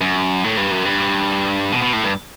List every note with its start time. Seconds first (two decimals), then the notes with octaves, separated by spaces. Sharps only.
0.01 F#2
0.44 A2
0.57 G2
0.72 F#2
0.85 G2
1.72 B2
1.82 B2
1.93 A2
2.04 G2